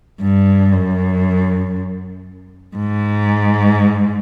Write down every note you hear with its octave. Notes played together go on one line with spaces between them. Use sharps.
G2
F#2
G#2